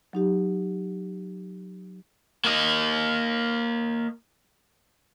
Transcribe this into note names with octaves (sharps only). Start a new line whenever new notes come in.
F#3 D#4 G4
A#3 D#5